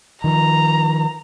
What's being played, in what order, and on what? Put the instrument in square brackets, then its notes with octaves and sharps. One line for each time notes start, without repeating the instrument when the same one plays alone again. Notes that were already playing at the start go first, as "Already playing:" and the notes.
[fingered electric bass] D#3 F3 [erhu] A#5